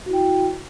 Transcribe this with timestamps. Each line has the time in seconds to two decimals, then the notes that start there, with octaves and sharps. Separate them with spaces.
0.06 F#4
0.10 E4
0.13 G5